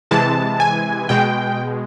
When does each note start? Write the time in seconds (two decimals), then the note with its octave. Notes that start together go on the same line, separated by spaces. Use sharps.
0.11 C3 E3 G#3 A5
0.60 G#5
1.09 B2 G#3 G5